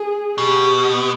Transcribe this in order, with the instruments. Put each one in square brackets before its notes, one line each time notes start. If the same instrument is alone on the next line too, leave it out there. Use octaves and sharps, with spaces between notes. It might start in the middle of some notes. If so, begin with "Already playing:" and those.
Already playing: [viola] G#4
[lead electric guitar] B2 [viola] G4